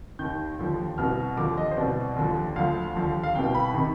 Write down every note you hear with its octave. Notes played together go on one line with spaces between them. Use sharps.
D#2 D#3 G6
D#2 D3 F3
C2 B2 F6
D#2 D3 F3 D6
D#5
C5
C2 B2 D5
D#2 D3 F3
D2 D3 F3 F5
D#2 D3 F3
F5
C2 B2 G5
B5
C3 D#3 B5